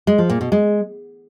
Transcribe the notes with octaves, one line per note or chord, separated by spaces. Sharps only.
G#3
F3
A#2
B2
G#3